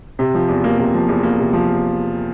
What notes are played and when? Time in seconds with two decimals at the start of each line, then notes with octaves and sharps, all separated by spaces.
0.19 C3
0.34 F3
0.48 E2
0.64 A#3
0.78 C3
0.94 F3
1.08 E2
1.23 A#3
1.39 C3
1.53 F3